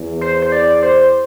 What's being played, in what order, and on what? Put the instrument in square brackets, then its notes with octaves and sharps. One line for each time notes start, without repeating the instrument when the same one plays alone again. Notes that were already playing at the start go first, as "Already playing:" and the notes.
Already playing: [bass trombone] E2
[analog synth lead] C5
C5
D5
C5